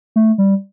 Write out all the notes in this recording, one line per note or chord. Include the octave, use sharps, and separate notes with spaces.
A3
G3